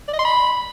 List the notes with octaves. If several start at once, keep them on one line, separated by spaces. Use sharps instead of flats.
D5
D#5
C6
B5